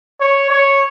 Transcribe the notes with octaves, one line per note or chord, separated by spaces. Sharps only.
C#5
C#5